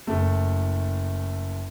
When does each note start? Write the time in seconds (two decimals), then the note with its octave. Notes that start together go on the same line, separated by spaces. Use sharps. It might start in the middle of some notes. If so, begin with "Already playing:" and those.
0.07 F#1 A3